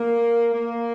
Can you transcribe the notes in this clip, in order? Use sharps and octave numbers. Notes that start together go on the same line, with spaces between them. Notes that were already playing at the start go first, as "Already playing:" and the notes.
Already playing: A#3
A#3